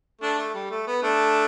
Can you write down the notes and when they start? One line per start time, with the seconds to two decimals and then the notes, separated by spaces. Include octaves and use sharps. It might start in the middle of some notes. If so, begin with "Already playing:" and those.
0.21 A3 D4
0.38 A3
0.54 G3
0.71 A3
0.87 B3
1.03 A3 D4